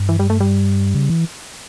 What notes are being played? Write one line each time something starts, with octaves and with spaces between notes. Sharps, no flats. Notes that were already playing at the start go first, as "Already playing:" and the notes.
Already playing: G2
E3
G3
A3
G3
C#3
E3